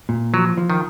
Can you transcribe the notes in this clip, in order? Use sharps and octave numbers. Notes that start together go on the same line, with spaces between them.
A#2
F3 F#3
F3
D#3